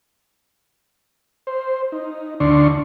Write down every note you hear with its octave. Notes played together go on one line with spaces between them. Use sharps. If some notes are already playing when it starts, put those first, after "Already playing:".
C5
D#4
D2 D3 D4 D5 C6 C#6